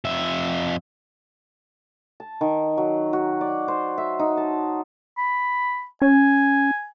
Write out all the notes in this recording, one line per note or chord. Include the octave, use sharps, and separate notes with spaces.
F2 E5
A5
D#3
F#3
F#4
D5
C5
E5
D#4
A5
B5
C#4 G#5